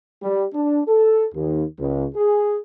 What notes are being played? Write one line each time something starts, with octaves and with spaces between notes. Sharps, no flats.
G3
D4
A4
D#2
C#2
G#4